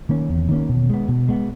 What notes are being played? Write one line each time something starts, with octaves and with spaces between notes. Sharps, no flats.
D#3 A#3 C#4
E2
D#3 A#3 C#4
B2
G#3 B3
B2
G#3 B3